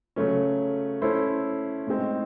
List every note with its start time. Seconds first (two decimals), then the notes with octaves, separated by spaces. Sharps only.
0.16 C#3 F#3 A3 C#4
1.02 A3 C#4 E4 A4 C5
1.87 A2 G#3 C4 D#4